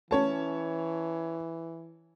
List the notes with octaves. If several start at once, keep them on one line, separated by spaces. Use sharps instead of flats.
E3 C#4 C#5 A5